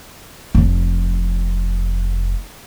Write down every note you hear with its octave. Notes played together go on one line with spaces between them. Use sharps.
F1 F3